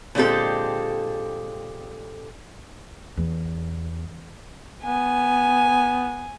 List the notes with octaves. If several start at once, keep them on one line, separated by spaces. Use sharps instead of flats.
A#2 D3 G#3 C4 G4 A4
E2
B3 G#5